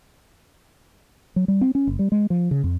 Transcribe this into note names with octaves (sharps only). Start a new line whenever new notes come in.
F#3
G3
C4
C#4
F#1
G3
G#3
F3
C#3
F2